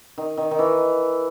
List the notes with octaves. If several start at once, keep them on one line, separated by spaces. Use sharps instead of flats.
D#3
D#3
D#3
E3